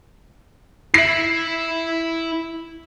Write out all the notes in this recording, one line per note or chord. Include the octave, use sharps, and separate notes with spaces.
E4 E5 C7